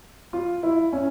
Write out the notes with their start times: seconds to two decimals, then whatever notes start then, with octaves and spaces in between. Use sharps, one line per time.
0.33 F4
0.63 E4
0.93 C#4